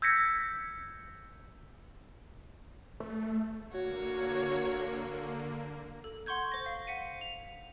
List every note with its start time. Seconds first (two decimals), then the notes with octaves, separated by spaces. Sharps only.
0.02 E6 G6 G#6 A#6 B6 C#7
3.00 A3
3.72 D3 A#3 F#4 C#5
6.04 A4
6.26 F#5 C6 C#6 G6 G#6
6.52 C5 A#6
6.66 F5
6.87 F#5 B6 C#7 D#7
7.21 F7